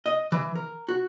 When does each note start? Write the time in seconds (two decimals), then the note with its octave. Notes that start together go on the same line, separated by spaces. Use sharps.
0.06 D#5
0.32 E3
0.55 A#4
0.89 F#4